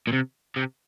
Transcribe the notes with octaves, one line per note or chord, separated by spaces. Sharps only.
A#2
C3
C3